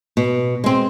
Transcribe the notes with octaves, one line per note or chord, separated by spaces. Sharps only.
B2
G#3 C4